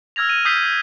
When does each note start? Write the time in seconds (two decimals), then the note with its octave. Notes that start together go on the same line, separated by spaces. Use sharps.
0.16 E6 F6 G#6 A#6 F7
0.29 D#7
0.45 D#6 E6 G6 B6 C7 G7